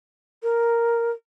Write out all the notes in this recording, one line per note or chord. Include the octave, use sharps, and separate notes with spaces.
A#4